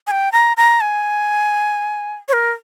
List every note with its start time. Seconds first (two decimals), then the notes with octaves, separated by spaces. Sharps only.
0.07 G#5
0.11 G5
0.32 A#5
0.57 A#5
0.81 G#5
2.28 C#5
2.33 A#4